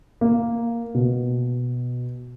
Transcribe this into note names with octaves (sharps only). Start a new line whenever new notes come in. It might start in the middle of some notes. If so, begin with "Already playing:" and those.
A#3
B2